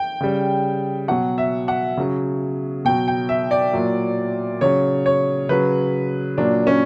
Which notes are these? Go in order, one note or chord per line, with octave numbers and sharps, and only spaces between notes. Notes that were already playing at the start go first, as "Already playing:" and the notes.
Already playing: G5
C#3 G3
B2 F#3 F#5
E5
F#5
C#3 F#3
B2 F#3 G5
G5
E5
D5
A#2 F#3
C#3 F#3 C#5
C#5
C#3 F#3 B4
A#2 F#3 D4
C#4